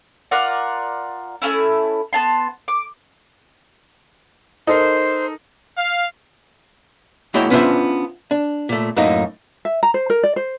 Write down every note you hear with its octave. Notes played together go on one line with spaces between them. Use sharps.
F4 A#4 D5 F#5
A3 A#3 C#4 E4
B3 A5 C6
D6
D#4 A4 A#4 C5
F5
G#3 A#3 E4 F#4 C#5 G5
B3 C#4 D4 F4 C5 E5
D4
A#2 A3
F#2 A2 A#3 D#4
E5
A#5
C5
A#4
D5
C5